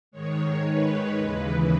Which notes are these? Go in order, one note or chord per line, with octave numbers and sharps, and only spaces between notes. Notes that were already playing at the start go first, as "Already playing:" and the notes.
G#2 D#3 G#3 C#5
B4
D#2 C#3 E3 G#3